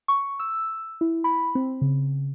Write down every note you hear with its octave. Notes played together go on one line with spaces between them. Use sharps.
C#6
E6
E4
B5
C4
C#3